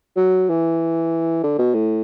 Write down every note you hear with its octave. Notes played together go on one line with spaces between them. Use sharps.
F#3
E3
D3
B2
A2